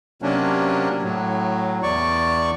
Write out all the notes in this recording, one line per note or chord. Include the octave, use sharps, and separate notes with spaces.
C3 F#3 A#3 C#4 D4
A2 F#3
E2 D5 C#6